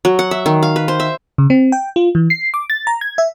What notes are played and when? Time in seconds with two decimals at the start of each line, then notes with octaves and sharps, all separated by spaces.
0.05 F#3
0.19 F#5
0.31 E5
0.46 D#3
0.62 F5
0.76 B4
0.88 C5
1.00 E5
1.38 C#3
1.50 C4
1.72 G5
1.96 F4
2.15 E3
2.30 C7
2.54 D6
2.70 A6
2.87 A#5
3.01 G#6
3.18 E5